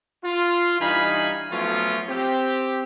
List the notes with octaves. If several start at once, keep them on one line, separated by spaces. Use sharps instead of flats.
F4
G2 E3 D#4 F5 G#5 B5
F3 F#3 A3 B3 C#4 F4
C4 G4